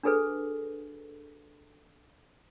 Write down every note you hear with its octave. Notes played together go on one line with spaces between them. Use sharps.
D4 F#4 G#4 A4 B4